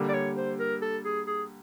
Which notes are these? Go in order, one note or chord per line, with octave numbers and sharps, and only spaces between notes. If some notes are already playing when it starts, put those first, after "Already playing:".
Already playing: D3 G3 A#3
D5
C#5
C5
A#4
A4
G#4
G#4